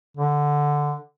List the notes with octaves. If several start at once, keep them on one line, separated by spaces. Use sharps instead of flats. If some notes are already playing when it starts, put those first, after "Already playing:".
D3